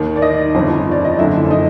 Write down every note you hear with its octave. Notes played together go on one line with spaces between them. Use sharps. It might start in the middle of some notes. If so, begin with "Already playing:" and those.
Already playing: D#2 D#3
D5
D#4 D#5
G1 F2 C#3
D5
D#5
F#1 F#2 D3 F3 E4 E5
D#4 D#5